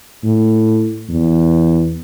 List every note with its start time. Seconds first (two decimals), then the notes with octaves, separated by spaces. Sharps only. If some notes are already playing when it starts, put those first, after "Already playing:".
0.23 A2
1.09 E2